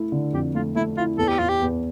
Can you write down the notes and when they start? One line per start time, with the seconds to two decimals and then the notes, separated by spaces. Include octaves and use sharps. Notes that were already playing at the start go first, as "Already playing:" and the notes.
Already playing: A3 E4
0.12 D3
0.33 F2 G4
0.55 A3 F4
0.75 A3 E4
0.97 E4 F4
1.18 E2 A4
1.28 G4
1.39 E2 F4
1.49 G4
1.61 E2